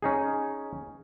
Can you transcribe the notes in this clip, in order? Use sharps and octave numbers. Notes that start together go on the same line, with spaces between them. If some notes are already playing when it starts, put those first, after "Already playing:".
C#4 D#4 G#4